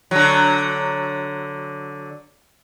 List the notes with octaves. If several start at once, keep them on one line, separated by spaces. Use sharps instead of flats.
D3 F#3